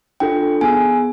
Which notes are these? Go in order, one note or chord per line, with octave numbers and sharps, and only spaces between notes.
D4 F4 A4 G5
B3 D#4 G#4 G#5